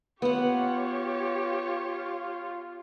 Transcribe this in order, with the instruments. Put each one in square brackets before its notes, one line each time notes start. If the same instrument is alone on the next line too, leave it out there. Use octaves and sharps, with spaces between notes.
[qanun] B3 F#5 [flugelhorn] F4 [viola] G4 C#5